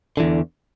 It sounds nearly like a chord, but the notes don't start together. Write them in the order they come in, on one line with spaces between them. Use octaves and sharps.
D3 E3 E2